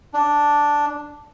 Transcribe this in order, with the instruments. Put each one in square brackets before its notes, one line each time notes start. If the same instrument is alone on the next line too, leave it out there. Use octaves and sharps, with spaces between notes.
[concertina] D4